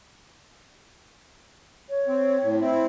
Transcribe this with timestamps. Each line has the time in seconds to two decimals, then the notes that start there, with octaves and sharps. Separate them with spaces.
1.89 C#5
2.08 C4
2.42 A2
2.60 C4 E4